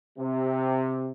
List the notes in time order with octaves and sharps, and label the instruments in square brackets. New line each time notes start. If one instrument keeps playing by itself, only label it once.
[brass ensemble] C3